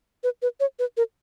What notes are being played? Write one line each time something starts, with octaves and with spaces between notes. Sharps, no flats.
B4
B4
C#5
B4
A#4